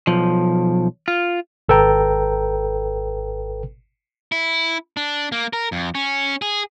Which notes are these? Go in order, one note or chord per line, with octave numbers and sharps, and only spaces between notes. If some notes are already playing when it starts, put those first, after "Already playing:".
B1 F3
F4
G#1 A4 B4 G5 A#5
E4
D4
A#3
A#4
F2
C#4
G#4